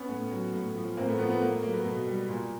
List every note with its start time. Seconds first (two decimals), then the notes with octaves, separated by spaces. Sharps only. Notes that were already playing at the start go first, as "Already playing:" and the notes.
Already playing: B3 C#4
0.09 A2
0.31 F#3
0.53 A2
0.75 F3
0.97 A2 A#3 C4
1.08 A3 B3
1.18 F3 A3 B3
1.30 A3 B3
1.41 A2 A#3
1.52 A3
1.62 F#3 A#3
1.74 A3 B3
1.85 B2
2.07 G3
2.28 A#2 A#3